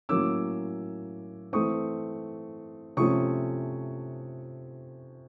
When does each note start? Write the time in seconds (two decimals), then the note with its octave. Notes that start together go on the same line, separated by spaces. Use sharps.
0.09 A2 F#3 A#3 C#4 D6 E6
1.53 E3 A3 C4 C#6 D#6
2.97 C3 F3 A3 C#4 C#6 D#6